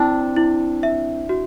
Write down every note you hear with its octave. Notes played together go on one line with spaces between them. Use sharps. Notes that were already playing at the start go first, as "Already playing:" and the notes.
Already playing: C4 D4 E4
E4
E5
F#4